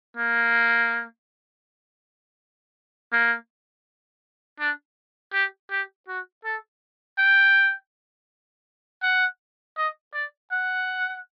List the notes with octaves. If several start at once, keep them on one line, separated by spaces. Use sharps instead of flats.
A#3
A#3
D4
G4
G4
F#4
A4
G5
F#5
D#5
D5
F#5